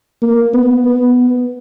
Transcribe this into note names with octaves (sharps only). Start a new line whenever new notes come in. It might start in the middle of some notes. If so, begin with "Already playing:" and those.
A#3
B3
B3